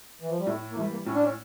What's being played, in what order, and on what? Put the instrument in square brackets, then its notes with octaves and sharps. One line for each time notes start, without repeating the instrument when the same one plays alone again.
[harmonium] E3
F3
G3
[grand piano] A2 [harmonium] A3
[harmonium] A#3
[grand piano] E3 [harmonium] A3
[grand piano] G3
[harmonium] A#3
[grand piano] A2 [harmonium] C#4
[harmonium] D4
C#4